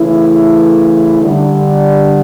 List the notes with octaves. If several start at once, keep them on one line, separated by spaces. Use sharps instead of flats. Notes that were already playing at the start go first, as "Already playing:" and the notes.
Already playing: C#3 E3 A3 E4
D3 G3 D4